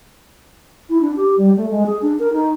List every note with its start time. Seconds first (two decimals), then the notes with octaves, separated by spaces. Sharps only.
0.89 E4
1.01 D4
1.16 G4
1.37 G3
1.56 A3
1.70 G#3
1.85 G#4
2.01 D4
2.19 A#4
2.32 D#4